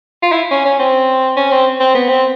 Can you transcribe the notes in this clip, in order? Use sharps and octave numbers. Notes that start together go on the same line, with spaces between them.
F4
E4
C#4
C#4
C4
C#4
C4
C4
B3
C4